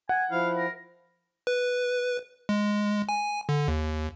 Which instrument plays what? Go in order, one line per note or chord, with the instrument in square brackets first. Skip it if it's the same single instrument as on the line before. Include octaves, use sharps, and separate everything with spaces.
[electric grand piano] F#5 [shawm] G#5
[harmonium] F3 E4 [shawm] F5
[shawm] A#4
[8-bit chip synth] B4
G#3
G#5
D3
D#2